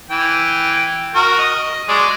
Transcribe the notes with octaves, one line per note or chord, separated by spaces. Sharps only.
E3 G5
F#4 A#4
D#5
F#3 G#3 D5